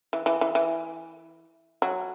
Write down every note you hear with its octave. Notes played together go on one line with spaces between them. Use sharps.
E3
E3
E3
E3
F#3